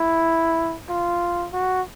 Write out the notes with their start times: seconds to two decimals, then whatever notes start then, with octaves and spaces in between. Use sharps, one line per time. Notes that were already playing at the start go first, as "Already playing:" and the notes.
Already playing: E4
0.89 F4
1.53 F#4